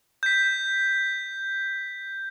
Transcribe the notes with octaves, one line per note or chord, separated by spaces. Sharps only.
G6 B6